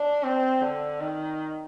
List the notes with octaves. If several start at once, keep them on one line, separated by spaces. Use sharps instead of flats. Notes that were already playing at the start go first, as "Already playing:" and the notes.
Already playing: D4
C4
D3
D#3